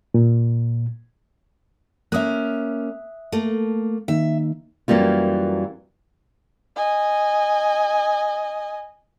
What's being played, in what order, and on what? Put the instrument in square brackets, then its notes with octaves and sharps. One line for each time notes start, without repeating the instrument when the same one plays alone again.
[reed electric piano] A#2
[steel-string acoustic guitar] A#3 C#4 [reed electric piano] E5 D#6 F#6
[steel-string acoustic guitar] A3 A#3
[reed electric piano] D#3 A#3 D#4 [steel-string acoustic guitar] E5
[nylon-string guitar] F#2 E3 G3 A#3 F4
[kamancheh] D#5 G#5